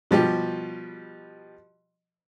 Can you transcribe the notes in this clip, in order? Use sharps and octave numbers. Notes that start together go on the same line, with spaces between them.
B2 F3 G3 G4